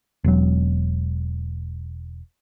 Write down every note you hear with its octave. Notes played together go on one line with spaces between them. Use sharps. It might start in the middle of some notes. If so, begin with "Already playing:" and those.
E1 F#3